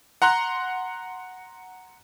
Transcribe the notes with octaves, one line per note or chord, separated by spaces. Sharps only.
F#5 A#5 C6 F#6